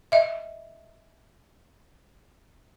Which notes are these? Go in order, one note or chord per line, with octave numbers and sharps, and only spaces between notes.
D#5 E5